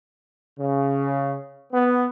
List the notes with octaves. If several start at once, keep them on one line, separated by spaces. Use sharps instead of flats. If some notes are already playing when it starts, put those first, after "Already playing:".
C#3
B3